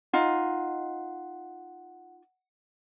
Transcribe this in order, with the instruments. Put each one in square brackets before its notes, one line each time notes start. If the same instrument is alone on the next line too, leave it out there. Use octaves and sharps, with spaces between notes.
[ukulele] D#4 F4 D#5 [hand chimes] F#5